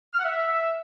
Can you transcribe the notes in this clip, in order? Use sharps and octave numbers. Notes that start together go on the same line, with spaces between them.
F6
F#5
E5